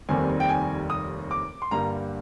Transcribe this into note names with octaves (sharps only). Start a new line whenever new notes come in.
F1 D#2 D#3 G3 C4 G#5
G5
G#5
D#6
D6
C6
G2 D3 G3 A#3 A#5